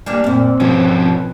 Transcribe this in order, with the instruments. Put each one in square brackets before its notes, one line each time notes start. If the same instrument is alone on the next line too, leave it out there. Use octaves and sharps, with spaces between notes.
[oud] G3 A#3 D4 [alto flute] G#5
[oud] F#2 A#2 [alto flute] C4
[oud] B2 [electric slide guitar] F3 C#4